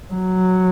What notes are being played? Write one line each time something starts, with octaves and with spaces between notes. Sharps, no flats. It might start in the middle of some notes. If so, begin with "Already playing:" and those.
F#3